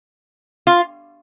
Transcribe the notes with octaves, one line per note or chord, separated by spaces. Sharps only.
F4